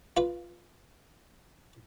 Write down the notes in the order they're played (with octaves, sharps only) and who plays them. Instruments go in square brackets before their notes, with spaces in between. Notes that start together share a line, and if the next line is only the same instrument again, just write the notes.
[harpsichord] F4 B4